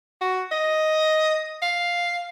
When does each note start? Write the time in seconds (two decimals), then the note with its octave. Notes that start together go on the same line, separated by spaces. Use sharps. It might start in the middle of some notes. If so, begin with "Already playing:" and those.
0.21 F#4
0.51 D#5
1.62 F5